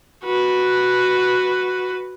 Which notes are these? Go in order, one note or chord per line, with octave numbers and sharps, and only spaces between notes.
F#4 B4